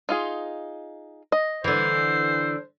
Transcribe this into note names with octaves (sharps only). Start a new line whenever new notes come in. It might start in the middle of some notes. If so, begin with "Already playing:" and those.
D#4 F4 G#4
D#5
D3 E3 C5